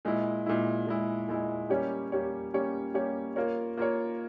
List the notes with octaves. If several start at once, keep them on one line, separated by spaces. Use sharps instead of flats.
A#2 G#3 E4
A#2 G#3 E4
A#2 G#3 E4
A#2 G#3 E4
G3 A#3 C#4 G4 C#5
G3 A#3 C#4 G4 C#5
G3 A#3 C#4 G4 C#5
G3 A#3 C#4 G4 C#5
A#3 F4 A#4 C#5
A#3 F4 A#4 C#5